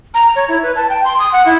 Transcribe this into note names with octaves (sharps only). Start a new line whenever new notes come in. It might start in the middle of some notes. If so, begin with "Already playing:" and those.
A#5
C#5
E4
B4
A5
G5
C6
D#6
F#5
E4